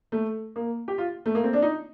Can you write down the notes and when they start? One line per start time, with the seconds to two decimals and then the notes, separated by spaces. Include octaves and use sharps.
0.12 A3
0.56 A#3
0.88 G4
0.98 F4
1.26 A3
1.35 A#3
1.44 C4
1.53 D4
1.62 D#4